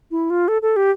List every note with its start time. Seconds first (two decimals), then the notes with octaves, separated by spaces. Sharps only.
0.11 E4
0.30 F4
0.48 A4
0.62 A4
0.76 G4